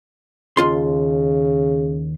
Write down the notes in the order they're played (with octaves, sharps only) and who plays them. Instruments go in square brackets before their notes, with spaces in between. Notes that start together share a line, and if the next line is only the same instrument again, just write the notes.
[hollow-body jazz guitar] D#2 F4 C6 [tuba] C#3